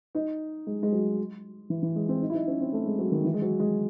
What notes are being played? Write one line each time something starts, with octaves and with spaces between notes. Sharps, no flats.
D#4
G#3
G#3
F#3
E3
E3
G#3
C4
D#4
E4
D#4
C#4
C4
A3
G#3
F#3
D#3
E3
G#3
F#3
G#3